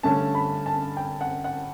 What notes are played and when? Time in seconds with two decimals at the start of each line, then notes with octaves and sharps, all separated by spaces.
0.03 G2 D3 A3 C#4 A5
0.35 B5
0.66 A5
0.97 G5
1.21 F#5
1.44 F#5